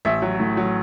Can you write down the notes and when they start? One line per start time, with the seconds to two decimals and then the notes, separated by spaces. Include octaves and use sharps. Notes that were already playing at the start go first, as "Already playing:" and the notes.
0.05 A1 E5
0.22 F#3
0.40 A2
0.57 F#3